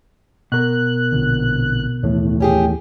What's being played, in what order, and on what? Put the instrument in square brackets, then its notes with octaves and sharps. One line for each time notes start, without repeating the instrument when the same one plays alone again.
[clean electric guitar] B2 A#4 [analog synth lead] F#6
[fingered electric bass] A#1 D3
[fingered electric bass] D#2 E3 [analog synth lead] A2
[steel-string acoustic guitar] C#4 G4 G#4